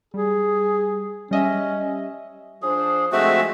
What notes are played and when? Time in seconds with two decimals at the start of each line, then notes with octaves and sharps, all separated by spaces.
0.14 G3 G#4
1.31 G3 C#4 D#5 E5
2.62 F3 D4 G#4 C5
3.12 C3 F3 G#3 A3 C4 F#4 E5